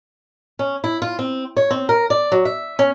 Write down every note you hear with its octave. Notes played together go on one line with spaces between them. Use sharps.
C#4
E4
F4
C4
C#5
C4
A#4
D5
F#3
E5
C#4